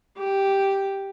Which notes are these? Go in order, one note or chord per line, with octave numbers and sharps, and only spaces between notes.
G4